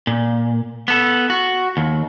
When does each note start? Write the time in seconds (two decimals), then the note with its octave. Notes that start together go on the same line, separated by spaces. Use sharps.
0.07 A#2
0.88 B3 A4
1.30 F#4
1.77 D#2